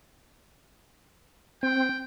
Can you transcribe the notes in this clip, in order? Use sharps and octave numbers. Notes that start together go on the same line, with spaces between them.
C4 G5